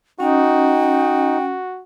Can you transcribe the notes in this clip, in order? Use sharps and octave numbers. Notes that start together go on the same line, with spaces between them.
C#4 D#4 F#4 G5